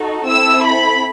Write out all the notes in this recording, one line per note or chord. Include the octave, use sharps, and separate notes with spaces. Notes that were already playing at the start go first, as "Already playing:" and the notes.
Already playing: D#4 F#4 A4
C4 E4 A4 E6
B5